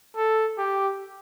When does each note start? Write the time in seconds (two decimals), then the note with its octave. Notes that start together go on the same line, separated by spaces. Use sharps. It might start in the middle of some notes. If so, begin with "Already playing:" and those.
0.16 A4
0.58 G4